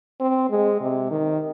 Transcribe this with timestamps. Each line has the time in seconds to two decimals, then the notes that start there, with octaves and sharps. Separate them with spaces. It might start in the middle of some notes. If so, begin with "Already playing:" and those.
0.20 C4
0.51 G#3
0.81 C3
1.11 D#3